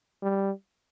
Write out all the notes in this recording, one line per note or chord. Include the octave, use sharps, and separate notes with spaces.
G3